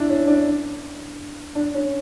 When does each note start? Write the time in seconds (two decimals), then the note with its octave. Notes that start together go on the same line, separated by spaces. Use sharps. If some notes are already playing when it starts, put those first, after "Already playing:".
Already playing: D4 E4
0.09 C#4
0.27 D4
1.55 D4
1.74 C#4